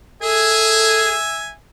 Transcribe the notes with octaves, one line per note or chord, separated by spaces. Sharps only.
G#4 A4 E5 G#5